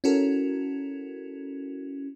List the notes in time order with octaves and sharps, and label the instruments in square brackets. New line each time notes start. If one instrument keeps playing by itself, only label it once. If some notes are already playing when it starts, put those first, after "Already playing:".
[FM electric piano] C#4 E4 F#4 A4 A#4